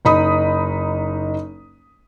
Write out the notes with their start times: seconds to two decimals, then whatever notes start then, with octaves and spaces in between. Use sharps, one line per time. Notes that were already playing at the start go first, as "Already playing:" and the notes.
0.05 F#1 D#4 B5 D#6